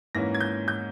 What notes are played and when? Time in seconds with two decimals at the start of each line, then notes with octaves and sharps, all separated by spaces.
0.15 G#2 E3 A#3 C#4 A#6
0.35 G#6
0.40 G6
0.68 G6